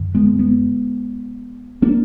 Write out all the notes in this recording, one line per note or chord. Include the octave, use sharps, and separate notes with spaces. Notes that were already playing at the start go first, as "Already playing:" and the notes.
Already playing: F#2 D3
G#3 B3
G#3 B3
A#3 D4